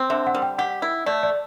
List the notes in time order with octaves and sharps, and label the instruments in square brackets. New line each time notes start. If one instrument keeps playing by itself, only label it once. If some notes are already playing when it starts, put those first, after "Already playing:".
Already playing: [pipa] C4
[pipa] D3 [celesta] E5
[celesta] F#5
[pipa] G3
[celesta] G5
[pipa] G4 [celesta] F#5
[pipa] E4
[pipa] A3 [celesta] D5
[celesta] D5